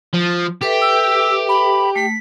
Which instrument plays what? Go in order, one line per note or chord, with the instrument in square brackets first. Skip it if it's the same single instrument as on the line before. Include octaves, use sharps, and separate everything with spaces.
[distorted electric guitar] F3
[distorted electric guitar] G4 [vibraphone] A4 B4 E5
[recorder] E6
B5
[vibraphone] A3 [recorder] B6